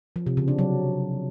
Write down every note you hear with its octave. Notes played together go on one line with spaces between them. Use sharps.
F3
C3
C#3
D4
F#3